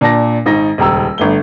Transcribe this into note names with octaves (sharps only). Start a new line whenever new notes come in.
A#2 D4 A5 A#6
G#1 D#4 A#6
D#1 C#2 A#5 E6
G1 A3 G7